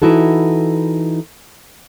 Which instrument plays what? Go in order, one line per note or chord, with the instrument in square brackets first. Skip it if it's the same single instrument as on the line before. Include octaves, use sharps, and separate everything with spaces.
[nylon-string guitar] E3 D#4 E4 F#4 A4